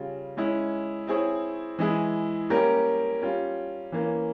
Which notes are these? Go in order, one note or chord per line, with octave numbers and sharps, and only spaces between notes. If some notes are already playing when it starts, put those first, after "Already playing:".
Already playing: C#3 G3 C#4 F4
G#3 C#4 E4
C4 E4 G#4 C#5
E3 G#3 E4 G#4
G3 A#3 C#4 G4 A#4
G3 C#4 F4
E3 A#3 C#4